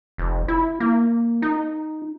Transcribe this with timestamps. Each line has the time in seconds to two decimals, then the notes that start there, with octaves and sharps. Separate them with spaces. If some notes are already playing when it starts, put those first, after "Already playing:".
0.18 F1
0.48 E4
0.80 A#3
1.42 D#4